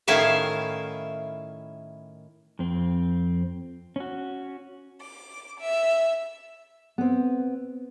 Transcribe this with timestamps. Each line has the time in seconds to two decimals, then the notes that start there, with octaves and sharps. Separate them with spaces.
0.07 A2 D#3 C#4 E4 E5 F5
2.59 F2 C4
3.96 C#4 F#4
5.01 D6
5.60 E5
6.98 B3 C4